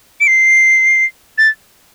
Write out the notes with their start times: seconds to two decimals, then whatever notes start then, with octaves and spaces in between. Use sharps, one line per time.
0.21 D7
0.27 C7
1.38 A6